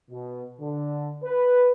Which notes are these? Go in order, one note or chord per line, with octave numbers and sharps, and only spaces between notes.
B2
D3
B4